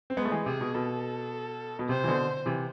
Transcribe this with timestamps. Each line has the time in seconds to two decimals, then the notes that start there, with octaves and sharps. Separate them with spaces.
0.10 C4
0.17 G#3 B3 B4
0.25 A3
0.31 E3 G#3
0.46 C3 G#4
0.61 B2
0.74 B2 A4
1.79 B2
1.88 C3 C5
2.04 E3
2.08 B2 D3
2.46 C3 E3